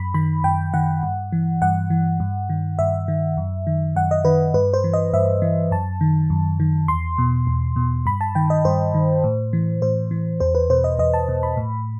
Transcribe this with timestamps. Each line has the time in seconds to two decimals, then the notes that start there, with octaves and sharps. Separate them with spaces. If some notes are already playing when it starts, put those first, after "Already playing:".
Already playing: F#2 B5
0.14 D#3 B5
0.44 F#2 G5
0.74 D#3 F#5
1.03 G2
1.32 E3
1.62 G2 F#5
1.90 E3
2.20 G2
2.50 D#3
2.79 G2 E5
3.08 D#3
3.37 F#2
3.67 D#3
3.96 F#2 F#5
4.11 D#5
4.25 D#3 B4
4.54 G2 B4
4.74 C5
4.84 E3
4.93 D#5
5.13 G2 E5
5.42 E3
5.71 F#2 A5
6.01 D#3
6.30 F#2
6.60 D#3
6.88 E2 C6
7.18 B2
7.47 E2
7.76 B2
8.06 G2 B5
8.21 A5
8.35 D#3 G5
8.50 D#5
8.65 G2 C5
8.94 D#3
9.24 A2
9.53 E3
9.82 A2 C5
10.11 E3
10.40 E2 C5
10.55 B4
10.70 B2 C5
10.84 D#5
10.99 E2 D#5
11.14 A5
11.29 B2
11.43 B5
11.57 A2